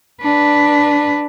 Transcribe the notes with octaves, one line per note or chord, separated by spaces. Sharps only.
D4 B4